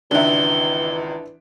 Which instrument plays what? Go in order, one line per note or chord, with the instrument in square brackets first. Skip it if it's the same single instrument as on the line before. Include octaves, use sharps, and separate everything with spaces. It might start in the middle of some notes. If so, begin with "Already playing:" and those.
[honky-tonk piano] G#1 C#2 [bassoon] E3 [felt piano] D4 E5 [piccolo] G7